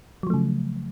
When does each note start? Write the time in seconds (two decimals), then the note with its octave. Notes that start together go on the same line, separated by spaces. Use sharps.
0.23 F#3
0.27 F3
0.30 A3
0.34 C#3